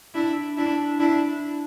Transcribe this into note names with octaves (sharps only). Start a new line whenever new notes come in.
D4 E4
D4 E4
D4 E4